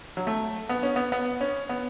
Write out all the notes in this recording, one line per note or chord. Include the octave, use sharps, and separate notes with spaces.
F#3
A3
B3
C#4
B3
B3
C#4
B3